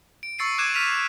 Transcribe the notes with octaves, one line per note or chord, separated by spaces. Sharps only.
D7
C#6 E6 A6 C7 C#7 D#7
D6 F#6 G#6 D#7 E7
F6 B6 D#7 F7
C7